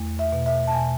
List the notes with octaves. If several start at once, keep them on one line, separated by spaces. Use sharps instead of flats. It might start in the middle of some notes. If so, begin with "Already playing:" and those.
Already playing: E2 A3
E5
B2
E5
A5
B2 G#5